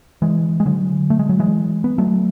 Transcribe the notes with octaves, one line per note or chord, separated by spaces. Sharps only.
E3 G#3
G#3
D3 F#3
A3
G#3
F#3
E3 G#3
B3
F#3 A3